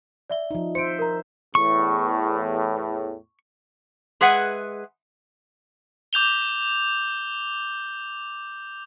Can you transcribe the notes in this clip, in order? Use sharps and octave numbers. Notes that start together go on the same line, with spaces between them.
D5 E5 G7
F3 D#4
C5 E5 C#7 D7
A#4 A#5
E2 A2 C#6
G#3 G#4 B4 E5 F#5
D6 G6 F7 G7